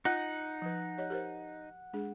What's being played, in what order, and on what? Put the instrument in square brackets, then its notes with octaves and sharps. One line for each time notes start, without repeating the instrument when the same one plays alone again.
[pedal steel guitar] D#4 [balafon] F4 [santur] F#5
[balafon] F3 B4
G4 C#5 D#5
G4 A#4 C5
G#3 D4 G#4